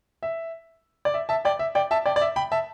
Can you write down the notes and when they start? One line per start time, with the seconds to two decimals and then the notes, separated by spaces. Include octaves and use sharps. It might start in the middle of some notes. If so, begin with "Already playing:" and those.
0.23 E5
1.05 D5
1.14 E5
1.29 E5 A5
1.45 D5 G5
1.59 E5
1.75 D5 G5
1.91 E5 A5
2.06 D5 G5
2.16 D5
2.21 E5
2.36 G5 B5
2.52 E5 A5